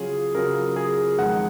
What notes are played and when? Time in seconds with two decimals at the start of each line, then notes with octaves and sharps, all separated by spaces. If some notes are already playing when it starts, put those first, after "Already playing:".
Already playing: C#3 F#3 C#4 F4 G#4
0.35 C#3 F#3 C#4 F4 A#4
0.76 G#4
1.19 F2 D#3 G#3 D#4 F#5